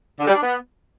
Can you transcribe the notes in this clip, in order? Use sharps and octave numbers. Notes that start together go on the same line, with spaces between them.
D3
G3
D4
B3